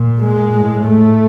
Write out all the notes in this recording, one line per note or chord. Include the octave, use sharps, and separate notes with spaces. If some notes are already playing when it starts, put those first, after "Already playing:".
Already playing: A#2
G#3
A2
A3